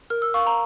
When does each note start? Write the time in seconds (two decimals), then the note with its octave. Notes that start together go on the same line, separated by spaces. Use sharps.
0.10 A#4 F6
0.22 E6
0.34 F5 C#6
0.47 A#5